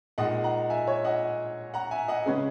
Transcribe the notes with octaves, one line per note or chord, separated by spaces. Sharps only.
A#2 G#3 D#4 D#5 F#5
F#5 A#5
E5 G#5
C#5 E5
D#5 F#5
F#5 A#5
E5 G#5
D#5 F#5
C#3 G#3 C#4 G#4 B4